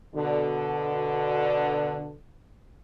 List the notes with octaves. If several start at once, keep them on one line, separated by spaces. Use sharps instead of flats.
B2 D3